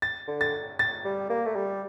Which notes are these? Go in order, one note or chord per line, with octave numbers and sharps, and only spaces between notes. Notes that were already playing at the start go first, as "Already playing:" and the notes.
A6
D3
A6
A6
G3
A#3
A3
G3